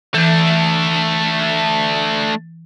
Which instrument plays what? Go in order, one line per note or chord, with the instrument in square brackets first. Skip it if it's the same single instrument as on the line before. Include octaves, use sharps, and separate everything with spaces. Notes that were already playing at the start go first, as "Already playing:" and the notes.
[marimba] E3 G6 [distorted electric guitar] A3 D4